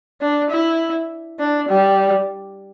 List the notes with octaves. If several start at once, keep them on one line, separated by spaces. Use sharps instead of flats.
D4
E4
D4
G3